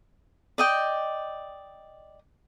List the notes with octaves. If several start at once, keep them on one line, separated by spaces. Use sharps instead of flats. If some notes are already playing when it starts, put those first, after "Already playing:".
D5 D#5 G5